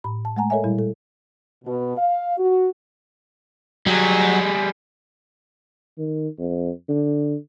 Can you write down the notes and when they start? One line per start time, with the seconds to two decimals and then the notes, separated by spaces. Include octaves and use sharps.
0.04 A2 B5
0.25 A5
0.37 G#3 A3 F#5 G#5 A#5
0.50 A4 A#4 C#5 D#5 E5 G#5
0.64 A#2 G3 E4
0.78 A4
1.65 B2
1.98 F5
2.38 F#4
3.86 F#3 G3 G#4
5.98 D#3
6.39 F2
6.89 D3